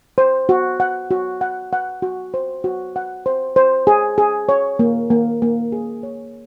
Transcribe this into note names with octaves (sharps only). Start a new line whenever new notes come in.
C5
F#4
F#5
F#4
F#5
F#5
F#4
C5
F#4
F#5
C5
C5
G#4
G#4
C#5
A#3
A#3
A#3
G#4
C#5